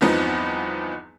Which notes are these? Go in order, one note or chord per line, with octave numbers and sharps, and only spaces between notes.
G1 E2 F3 B3 C4 D#4